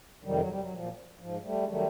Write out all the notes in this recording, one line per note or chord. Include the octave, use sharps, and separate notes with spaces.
F2 C3 D#3 F#3 G3
F#3
G3
F#3
A#2 F3
G#2 F3
G3 A3
G#3
D#3 F#3 G3 A3